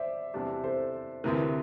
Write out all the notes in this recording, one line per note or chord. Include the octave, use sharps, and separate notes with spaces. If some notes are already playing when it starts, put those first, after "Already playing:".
Already playing: C5 D5 E5
E2 C3 G3 D4 G4
A4 C5
D2 C3 E3 A#4